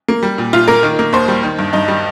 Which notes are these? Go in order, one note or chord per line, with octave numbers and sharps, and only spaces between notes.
A#3
G3
A#2
A#2 F4
A#3 A#4
D#3
A#3
D#2 C5
G3
D#3
G2
G2 D#4
G3